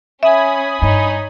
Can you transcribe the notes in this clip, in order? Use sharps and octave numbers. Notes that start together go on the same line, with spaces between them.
C#4 E5 G#5 B5 D#6
G2 D#4 C#5